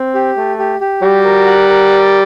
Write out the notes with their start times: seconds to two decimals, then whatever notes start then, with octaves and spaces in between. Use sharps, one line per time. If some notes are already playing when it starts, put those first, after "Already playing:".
Already playing: C4
0.15 G4
0.37 A3
0.59 G4
0.81 G4
1.02 G3 F#4
1.24 A#4
1.47 F#5
1.69 A#4
1.91 D5